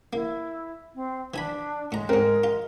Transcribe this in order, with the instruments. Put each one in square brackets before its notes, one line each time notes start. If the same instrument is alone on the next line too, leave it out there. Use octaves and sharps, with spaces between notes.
[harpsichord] A#3 [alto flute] E4
[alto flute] C4
[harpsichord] E3 G#5 B5 [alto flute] D4
[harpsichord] A2 A#5 [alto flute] G#3
[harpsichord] G#2 C4 [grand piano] A#4
[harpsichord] F4